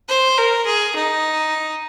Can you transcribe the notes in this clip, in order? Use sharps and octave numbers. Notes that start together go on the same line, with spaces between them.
C5
A#4
G#4
D#4